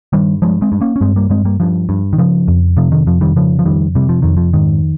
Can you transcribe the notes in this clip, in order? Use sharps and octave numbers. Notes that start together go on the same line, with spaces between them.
G2 D#3 G3
G2 F3 G#3
G#3 C4
G2
A#3 C#4
C#4
G2 G#3 C4
G3 A#3
G2 G#3 C4
G3 A#3
G2 F3
G2
D#3
C#3 F3
F2
C3 F3
D#3
F2 F3
D#3 G3
C#3 F3
F3
F2 D#3 G3
C3 G3
F3
F2 D#3
F3
G#2 D#3